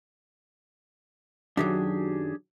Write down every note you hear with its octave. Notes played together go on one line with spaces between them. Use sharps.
F#2 D#3 F#3 D4 G4 G#4